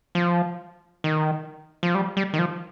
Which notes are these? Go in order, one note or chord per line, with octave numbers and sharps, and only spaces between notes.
F3
D#3
F3
G3
G3
D#3
F3